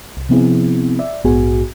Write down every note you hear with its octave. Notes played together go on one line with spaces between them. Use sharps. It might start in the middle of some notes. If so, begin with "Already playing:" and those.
C2
C3 F3 B3 C4 E4 G#4
D5 E5
A#1 G#2 B3 F#4 G#4 G#5